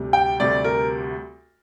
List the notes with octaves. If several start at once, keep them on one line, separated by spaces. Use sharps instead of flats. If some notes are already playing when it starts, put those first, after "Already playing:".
Already playing: D2 C3 G3
G5
D2 C3 G3 D5
A#4